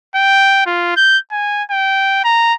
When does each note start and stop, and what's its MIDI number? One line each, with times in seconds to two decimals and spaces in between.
0.15 0.63 79
0.66 0.93 65
0.96 1.18 91
1.31 1.63 80
1.71 2.23 79
2.24 2.53 82